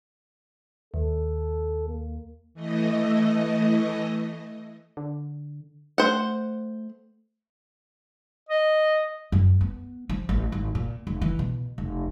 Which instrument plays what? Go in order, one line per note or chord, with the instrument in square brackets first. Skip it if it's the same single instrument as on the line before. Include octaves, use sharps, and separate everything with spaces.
[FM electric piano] D#2 [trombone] A4
[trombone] A#3
[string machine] E3 A3 D#5
[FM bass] D3
[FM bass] A3 [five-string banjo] C5 F#5
[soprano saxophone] D#5
[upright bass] F#2
B3
F3
A1
G#1
A#2
F1
E3
B2
F1